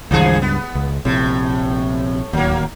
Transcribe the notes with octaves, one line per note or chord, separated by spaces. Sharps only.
C#2 G2 D#3 F3 G#4
B3
C#2
A#1 A2 C3
D1 D#2 F#3 A#3